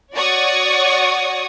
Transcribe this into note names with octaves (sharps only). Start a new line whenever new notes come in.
F#4 C#5 D5 C#6 D#6